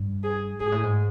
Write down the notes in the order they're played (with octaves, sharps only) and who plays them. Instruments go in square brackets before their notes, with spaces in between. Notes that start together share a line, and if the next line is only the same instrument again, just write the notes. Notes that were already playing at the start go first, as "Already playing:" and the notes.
Already playing: [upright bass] G2
[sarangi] G#4
[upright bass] G#2 [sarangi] G#4
[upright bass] A2
G#2